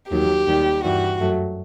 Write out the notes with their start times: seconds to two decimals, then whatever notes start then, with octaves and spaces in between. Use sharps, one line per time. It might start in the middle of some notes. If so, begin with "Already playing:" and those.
0.10 D#2 D#3 F#3 G4
0.47 D#2 D#3 G3
0.84 G2 E3 G3 F#4
1.20 F#2 F#3 A3